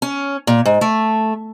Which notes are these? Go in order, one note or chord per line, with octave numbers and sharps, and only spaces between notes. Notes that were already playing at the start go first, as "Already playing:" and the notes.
C#4
A#2
G#2
A3